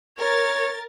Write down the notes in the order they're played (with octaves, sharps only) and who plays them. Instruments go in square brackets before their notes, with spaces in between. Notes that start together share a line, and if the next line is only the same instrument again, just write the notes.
[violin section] A#4 A6 [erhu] C#5